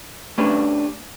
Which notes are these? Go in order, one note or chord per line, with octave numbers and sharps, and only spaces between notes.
A3 C#4 D4 G4 B4